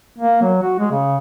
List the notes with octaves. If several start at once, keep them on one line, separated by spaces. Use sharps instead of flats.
A#3
F#3
F#4
G#3
C#3